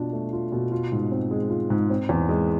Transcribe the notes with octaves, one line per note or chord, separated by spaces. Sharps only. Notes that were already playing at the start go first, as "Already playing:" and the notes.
Already playing: B2 D4 F4
A3
F4
B2
F4
G#2
C4
G#3
F4
G#2
C4
E2
G#3